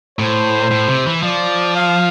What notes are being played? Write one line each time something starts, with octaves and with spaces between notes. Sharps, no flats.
A2 C5
A2
C3
E3
F3 D5
F5